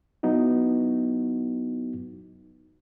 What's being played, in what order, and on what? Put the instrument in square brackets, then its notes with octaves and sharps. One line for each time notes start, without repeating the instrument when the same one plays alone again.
[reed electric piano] F#3 B3 D#4 E4 F#4